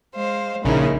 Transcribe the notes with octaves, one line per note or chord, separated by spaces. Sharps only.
G#3 C5 F5
A#1 C#3 D#4 E4 A#4